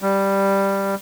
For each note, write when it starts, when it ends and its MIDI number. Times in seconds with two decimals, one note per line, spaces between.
0.02 0.95 55